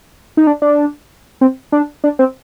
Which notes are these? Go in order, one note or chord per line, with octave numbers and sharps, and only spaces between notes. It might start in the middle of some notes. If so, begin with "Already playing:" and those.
D#4
D4
D4
C4
D4
D4
C4